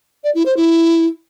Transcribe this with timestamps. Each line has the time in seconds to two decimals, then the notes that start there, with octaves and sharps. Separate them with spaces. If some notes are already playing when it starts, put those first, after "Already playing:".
0.24 D5
0.35 E4
0.46 C5
0.57 E4